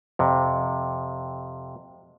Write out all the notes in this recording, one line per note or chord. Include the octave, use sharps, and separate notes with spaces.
F2 C3